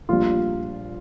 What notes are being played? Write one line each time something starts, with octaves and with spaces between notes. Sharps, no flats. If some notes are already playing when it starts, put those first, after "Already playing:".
A#1 A#2 G3 F4